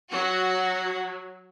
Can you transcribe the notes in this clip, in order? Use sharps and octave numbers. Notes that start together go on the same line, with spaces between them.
F#3 F#4